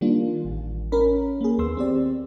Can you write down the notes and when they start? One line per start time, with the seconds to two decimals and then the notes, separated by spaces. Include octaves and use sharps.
0.01 D#3 G3 A#3 D4 F4
0.45 A1
0.92 C#4 A#4 B5
1.41 A#3 G#4
1.58 D#2 B3 C6 E6
1.77 C4 G4 D5